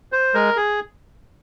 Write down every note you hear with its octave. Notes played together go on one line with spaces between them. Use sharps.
C5
G#3 A#4
G#4